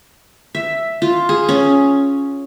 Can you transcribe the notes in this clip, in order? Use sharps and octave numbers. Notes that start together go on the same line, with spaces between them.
E5
F4
G#4
C#4